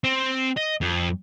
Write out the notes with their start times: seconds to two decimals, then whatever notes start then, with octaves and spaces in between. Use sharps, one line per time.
0.04 C4
0.57 D#5
0.81 F2